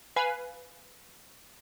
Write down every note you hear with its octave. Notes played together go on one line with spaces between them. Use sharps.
B4 F5 G#5 B5